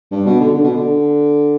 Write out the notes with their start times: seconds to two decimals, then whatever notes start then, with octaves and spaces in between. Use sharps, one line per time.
0.11 G2
0.26 B2
0.40 D3
0.54 D3
0.63 B2
0.72 D3